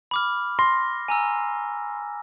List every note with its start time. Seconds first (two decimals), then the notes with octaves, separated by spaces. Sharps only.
0.11 B5 D6 F6
0.59 C6 A#6
1.08 G#5 A#5 E6